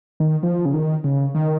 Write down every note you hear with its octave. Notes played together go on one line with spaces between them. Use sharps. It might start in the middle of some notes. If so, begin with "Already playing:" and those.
D#3
F3
C#3
D#3
C#3
D#3